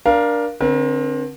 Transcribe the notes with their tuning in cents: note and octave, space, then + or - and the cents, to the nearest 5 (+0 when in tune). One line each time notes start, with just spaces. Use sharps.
D4 +0 A#4 +20 F5 +0
D3 +0 C4 +25 A#4 +45